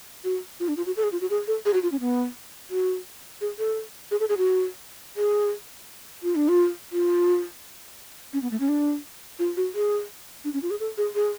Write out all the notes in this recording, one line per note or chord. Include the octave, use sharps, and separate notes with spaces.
F#4
F4
D4
F4
F#4
A4
G#4
F4
F#4
G#4
A4
G#4
F#4
F4
C#4
B3
F#4
G#4
A4
G#4
A4
G#4
F#4
G#4
F4
D4
F4
F4
C#4
B3
A3
C#4
D4
F4
F#4
G#4
D4
C#4
F4
G#4
A4
G#4
G#4